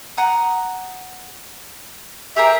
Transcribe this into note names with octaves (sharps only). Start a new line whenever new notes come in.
F#5 A#5 D#6
G4 G#4 A#4 E5